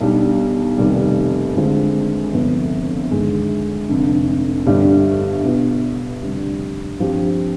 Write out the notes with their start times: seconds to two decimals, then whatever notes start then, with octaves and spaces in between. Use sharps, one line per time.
0.01 B1 B2 G3 D4
0.78 F1 D#2 D#3 G3
1.56 D2 D3 G#3 C4 F4
2.33 G1 F2 C3 F3 B3
3.11 G1 G2 D#3 G#3
3.88 F1 F2 D3
4.66 G1 G2 D3 G3 D4
5.43 B2 B3 F4
6.22 F1 F2 D3 G3 D4
6.99 G2 F3 C4 G4